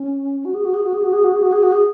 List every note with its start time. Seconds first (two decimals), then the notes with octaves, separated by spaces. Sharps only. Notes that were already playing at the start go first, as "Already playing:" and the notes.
Already playing: C#4
0.45 F#4
0.54 G#4
0.65 F#4
0.74 G#4
0.84 F#4
0.94 G#4
1.04 F#4
1.13 G#4
1.24 F#4
1.33 G#4
1.43 F#4
1.52 G#4
1.63 F#4
1.72 G#4